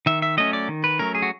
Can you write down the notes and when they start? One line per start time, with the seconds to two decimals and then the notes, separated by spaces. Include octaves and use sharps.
0.06 D#3 E5
0.22 E5
0.37 F#3 A3 C#4 D#5
0.53 D5
0.68 D#3
0.84 B4
0.99 F#3 A3 C#4 A#4
1.15 G#4
1.22 F#4